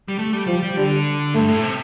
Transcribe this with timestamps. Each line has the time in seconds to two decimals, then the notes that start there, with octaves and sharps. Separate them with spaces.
0.08 G3
0.19 A3
0.33 G3
0.47 F3 G3
0.62 G3
0.76 D3 G3
1.34 G2 A3
1.48 A2
1.63 C3